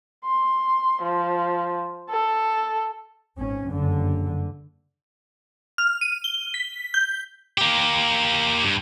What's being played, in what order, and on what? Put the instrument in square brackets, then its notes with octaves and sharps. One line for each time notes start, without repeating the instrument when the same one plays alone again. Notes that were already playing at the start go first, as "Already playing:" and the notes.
[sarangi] C6
F3
A4
[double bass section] G#1 C#4
F#1 G2 D3
[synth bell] F6
D#7
G7
B6
G6
[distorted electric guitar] A#3 G4
G2